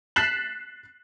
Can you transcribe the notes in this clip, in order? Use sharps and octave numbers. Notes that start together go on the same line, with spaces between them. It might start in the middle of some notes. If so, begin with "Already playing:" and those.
F#6 A6 B6 C7 E7 F#7